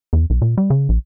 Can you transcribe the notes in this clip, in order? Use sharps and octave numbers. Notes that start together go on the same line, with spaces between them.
E2
B1
A#2
G3
C#3
A#1